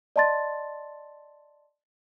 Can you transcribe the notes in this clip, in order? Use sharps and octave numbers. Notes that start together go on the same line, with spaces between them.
D5 D#5 A5 C6 A6